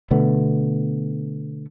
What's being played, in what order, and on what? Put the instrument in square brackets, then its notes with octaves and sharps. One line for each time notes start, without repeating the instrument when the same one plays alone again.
[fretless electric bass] B2 D3 A3 B3